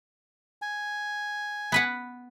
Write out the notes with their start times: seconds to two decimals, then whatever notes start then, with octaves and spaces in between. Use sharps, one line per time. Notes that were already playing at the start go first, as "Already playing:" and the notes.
0.62 G#5
1.72 B3 B4 F#5